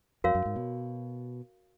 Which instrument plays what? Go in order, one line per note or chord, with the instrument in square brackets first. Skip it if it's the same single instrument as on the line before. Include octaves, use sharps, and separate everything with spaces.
[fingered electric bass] F2 [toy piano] F#4 A#4 C#5 F5
[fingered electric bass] F#2
G#2
B2